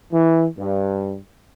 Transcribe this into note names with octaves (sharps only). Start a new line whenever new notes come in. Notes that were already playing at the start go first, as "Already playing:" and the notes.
E3
G2